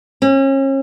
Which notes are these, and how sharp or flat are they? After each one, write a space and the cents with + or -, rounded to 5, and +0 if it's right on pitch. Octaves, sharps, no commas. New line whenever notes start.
C#4 -35